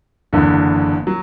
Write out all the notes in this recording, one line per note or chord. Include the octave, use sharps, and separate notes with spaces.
F#1 E2 D3
F#3